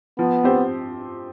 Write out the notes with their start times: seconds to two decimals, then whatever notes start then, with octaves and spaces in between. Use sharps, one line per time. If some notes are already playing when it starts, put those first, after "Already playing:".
0.18 F3 B3
0.44 C4 G4 C5